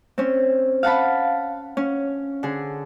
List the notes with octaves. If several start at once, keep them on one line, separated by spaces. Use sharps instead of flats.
C4 C#4
F5 F#5 A5 B5
C#4
D3 G#4